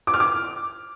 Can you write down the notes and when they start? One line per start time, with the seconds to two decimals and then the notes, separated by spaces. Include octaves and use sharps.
0.07 D6
0.14 F6
0.20 D6